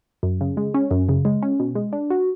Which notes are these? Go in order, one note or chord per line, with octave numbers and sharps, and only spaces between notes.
F#2
C#3
G#3
C#4
F#2
C#3
G#3
C#4
B2
G#3
D4
F#4